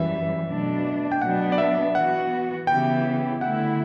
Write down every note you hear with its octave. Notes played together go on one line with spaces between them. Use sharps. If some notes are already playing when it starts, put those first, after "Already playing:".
Already playing: F#2 E3 G3 E5
B2 F#3 A3 D4
G5
B2 F#3 B3 D4 F#5
D5
E5
E3 B3 F#4 F#5
C#3 E3 B3 E4 G4 G5
D3 A3 E4 F#5